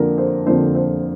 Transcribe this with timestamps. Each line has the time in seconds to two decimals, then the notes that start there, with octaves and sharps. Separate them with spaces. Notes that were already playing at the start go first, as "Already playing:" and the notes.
Already playing: F2 D3 F3 A#3 D4 A#4
0.18 C5
0.46 F2 D3 F3 A#3 D4 C5
0.75 C5